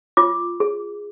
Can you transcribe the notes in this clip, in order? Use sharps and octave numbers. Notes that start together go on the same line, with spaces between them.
F4 D6
G#4